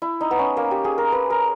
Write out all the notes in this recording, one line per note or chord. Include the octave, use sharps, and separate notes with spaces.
E4
D#4
B3
C#4
A#3
G4
G#4
A#4
B4
A#4